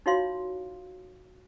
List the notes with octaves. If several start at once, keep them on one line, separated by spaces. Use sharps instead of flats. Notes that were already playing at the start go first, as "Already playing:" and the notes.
D#4 F4 F#4 C#5 F5 C6